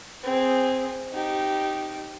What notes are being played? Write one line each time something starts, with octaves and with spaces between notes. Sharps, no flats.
C4 G#4
D#4 G4